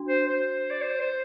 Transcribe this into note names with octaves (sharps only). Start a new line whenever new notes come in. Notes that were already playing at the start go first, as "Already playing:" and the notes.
Already playing: D4 F#4
C5
C5
D5
C5
C5